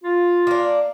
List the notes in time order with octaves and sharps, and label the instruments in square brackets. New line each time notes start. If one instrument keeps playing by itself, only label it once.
[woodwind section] F4
[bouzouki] A#3 D4